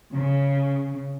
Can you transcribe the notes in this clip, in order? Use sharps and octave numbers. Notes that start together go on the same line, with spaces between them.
C#3